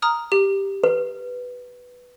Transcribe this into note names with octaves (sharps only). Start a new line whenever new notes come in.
A#5 D#6 F6
G4
B4